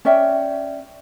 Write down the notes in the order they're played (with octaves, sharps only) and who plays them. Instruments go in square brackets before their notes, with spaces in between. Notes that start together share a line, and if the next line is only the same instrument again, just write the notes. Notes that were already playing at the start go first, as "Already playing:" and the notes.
[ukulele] C#4 D5 E5 G5